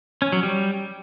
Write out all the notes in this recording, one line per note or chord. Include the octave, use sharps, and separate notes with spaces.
C#4
F#3
G3